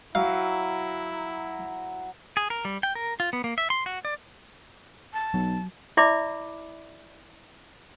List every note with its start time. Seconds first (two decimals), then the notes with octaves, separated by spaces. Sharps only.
0.15 F#3 E4 F5
2.37 G#4
2.50 A#4
2.65 G3
2.83 G5
2.95 A#4
3.20 F4
3.33 B3
3.44 A#3
3.58 E5
3.70 C6
3.86 F#4
4.05 D5
5.13 A5
5.34 B1 F#3
5.97 E4 D5 E5 B5 D6